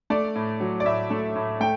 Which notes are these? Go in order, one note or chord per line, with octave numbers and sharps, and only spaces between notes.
A3 D5
A2
F#3
D5
A2 E5
A3
A2
A3 G5